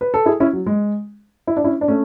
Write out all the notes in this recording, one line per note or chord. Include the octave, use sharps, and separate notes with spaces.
B4
A4
E4 G#4
C#4 E4
F#3
G#3
E4
D4
C#4 E4
D4
A3 C#4